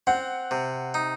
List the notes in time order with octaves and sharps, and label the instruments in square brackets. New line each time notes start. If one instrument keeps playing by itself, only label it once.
[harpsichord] C4 [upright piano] F#5
[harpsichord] C3
D#4